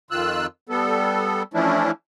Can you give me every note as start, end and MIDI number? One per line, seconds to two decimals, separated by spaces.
0.11 0.46 41
0.11 0.46 51
0.11 0.46 65
0.11 0.46 88
0.11 0.46 90
0.69 1.43 55
0.69 1.43 59
0.69 1.43 69
1.54 1.91 52
1.54 1.91 53
1.54 1.91 57
1.54 1.91 61
1.54 1.91 62
1.54 1.91 64